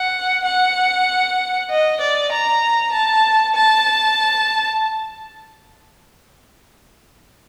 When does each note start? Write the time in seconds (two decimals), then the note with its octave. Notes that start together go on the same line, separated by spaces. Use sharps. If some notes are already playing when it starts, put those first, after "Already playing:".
Already playing: F#5
0.45 F#5
1.70 D#5
2.01 D5
2.32 A#5
2.93 A5
3.55 A5